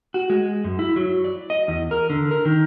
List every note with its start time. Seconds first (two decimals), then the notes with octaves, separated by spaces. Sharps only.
0.14 F#4
0.30 G#3
0.64 F#2
0.79 E4
0.96 F#3
1.24 D5
1.50 D#5
1.68 E2
1.91 A#4
2.10 D3
2.31 A#4
2.45 D#3